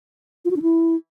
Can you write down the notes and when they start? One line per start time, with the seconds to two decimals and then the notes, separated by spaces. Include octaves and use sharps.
0.45 F4
0.51 F#4
0.56 D4
0.62 E4